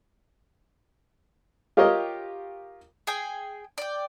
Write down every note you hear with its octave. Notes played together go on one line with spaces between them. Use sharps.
F4 G4 A#4 C#5 D#5
G#4 G5 G#5
D5 G5